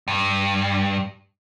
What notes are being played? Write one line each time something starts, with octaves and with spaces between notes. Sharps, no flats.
G2